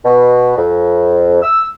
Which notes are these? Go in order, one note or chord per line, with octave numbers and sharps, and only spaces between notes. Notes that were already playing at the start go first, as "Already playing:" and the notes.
B2
F2
E6